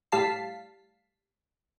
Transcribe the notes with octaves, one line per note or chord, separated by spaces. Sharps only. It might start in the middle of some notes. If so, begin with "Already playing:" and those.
A2 G3 F5 A5 B6 C7